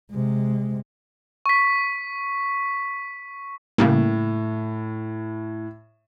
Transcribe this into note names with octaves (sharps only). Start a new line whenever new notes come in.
C3 G#3
C#6 B6
A2 C#3 G3 A#3